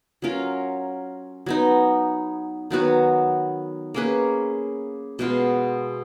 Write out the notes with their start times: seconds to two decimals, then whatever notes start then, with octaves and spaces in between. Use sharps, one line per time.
0.22 F#3 C#4 F4 A#4
1.46 F#3 B3 D#4
2.70 D#3 F#3 B3 F#4
3.94 A#3 C#4 G#4 B4
5.19 B2 G#3 B3 F4